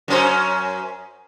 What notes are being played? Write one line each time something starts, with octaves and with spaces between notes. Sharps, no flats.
F#2 C#4 C5